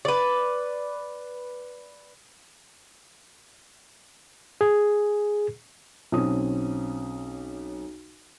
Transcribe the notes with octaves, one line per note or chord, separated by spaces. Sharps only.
B4 D5
G#4
B1 C4 C#4 D#6